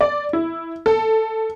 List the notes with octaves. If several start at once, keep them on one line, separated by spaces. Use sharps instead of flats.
D5
E4
A4